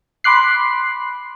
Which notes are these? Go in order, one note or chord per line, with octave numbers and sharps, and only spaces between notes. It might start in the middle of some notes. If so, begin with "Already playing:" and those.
B5 C6 D6 F#6 C7